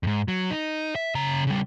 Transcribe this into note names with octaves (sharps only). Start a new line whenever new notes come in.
F2 G#2
F#3
D#4
E5
C#3 A#5
C#3 G3